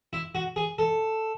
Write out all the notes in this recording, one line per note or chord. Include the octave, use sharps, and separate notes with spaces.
E4
F#4
G#4
A4